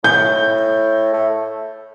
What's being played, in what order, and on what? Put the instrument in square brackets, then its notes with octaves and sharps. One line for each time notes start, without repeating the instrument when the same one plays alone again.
[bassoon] A2 [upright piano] G6
[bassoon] A3